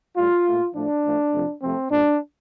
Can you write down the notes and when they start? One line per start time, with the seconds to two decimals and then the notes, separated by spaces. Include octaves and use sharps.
0.17 A2 G3 F4
0.46 A#2 A3
0.75 A2 F3 A3 D4
1.04 A2 F3 A3
1.33 F2 C3 F3 A3
1.62 F2 C3 F3 A3 C4
1.91 A#2 G3 D4